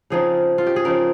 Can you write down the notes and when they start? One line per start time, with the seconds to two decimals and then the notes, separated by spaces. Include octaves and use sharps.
0.10 C#3 F3 C4 D#4 G#4
0.58 F4
0.67 G4
0.76 G#4
0.85 C#3 F3 C4 D#4 A#4